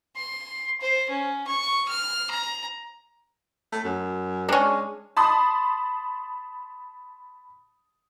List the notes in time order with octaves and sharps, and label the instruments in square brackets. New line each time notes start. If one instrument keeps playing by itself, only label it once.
[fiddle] C6
C5
C#4
C#6
F6
A#5
[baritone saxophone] A3
F#2
[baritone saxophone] G#3 [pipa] C#4 D4
[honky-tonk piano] A5 B5 C6 D#6